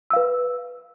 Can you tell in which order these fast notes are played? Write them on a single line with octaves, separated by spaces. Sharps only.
E6 F5 B4